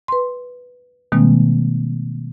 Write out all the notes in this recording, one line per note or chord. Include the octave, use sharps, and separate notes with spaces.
B4 C6
B2 D#3 G3 G#3 A#3 C4